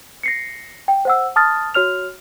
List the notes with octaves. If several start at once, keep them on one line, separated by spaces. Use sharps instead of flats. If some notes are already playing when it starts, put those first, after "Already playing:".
A#6 C7 C#7
G5
C5 F#5 E6
A5 D#6 F6 A6
F#4 C#5 F6 F7